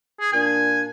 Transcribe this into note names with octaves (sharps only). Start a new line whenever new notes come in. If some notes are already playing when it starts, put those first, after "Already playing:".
G#4
A#2 D4 G#5